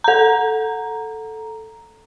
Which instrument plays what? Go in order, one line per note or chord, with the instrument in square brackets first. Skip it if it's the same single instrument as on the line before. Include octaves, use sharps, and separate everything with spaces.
[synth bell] A4 A#5